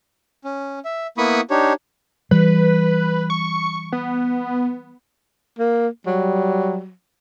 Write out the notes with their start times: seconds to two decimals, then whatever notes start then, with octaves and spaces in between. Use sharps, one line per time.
0.44 C#4
0.85 E5
1.18 A#3 B3 E4 B5 C#6 D#6
1.50 D4 D#4 G4 C#5
2.31 E3 G3 B4
3.30 C#6
3.92 B3
5.59 A#3
6.06 F#3 G3